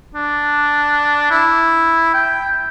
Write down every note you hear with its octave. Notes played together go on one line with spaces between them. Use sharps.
D4
E4
G5